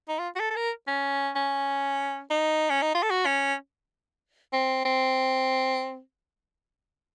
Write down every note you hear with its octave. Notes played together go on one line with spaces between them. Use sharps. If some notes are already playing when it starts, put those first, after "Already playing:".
D#4
F4
F#4
A4
A4
A#4
C#4
C#4
D#4
C#4
D#4
F4
A4
F#4
C#4
C4
C4